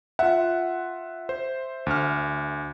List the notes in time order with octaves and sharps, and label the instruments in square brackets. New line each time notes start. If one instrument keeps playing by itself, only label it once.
[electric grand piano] F4 F#5 [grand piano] E5
[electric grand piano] C5
D2 F6